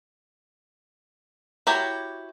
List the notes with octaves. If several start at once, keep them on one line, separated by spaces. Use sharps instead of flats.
E4 F#4 G4 C#5 A#5